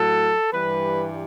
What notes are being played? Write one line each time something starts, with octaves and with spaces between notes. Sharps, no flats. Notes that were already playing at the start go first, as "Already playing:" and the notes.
Already playing: A2 F#3 A4
G2 E3 G3 B4